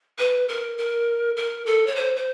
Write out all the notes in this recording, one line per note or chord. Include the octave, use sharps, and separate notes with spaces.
B4
A#4
A#4
A#4
A4
C#5
C5
C5